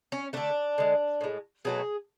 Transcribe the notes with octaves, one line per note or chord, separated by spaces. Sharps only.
C#4
D3 A3 D4
D3 G#3
A2 G#3
B2 F#3 A3 G#4